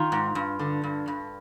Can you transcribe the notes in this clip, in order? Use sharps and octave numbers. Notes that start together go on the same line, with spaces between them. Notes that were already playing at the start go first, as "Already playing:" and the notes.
Already playing: D#3 F4
G#2
G2
D3
G2
G2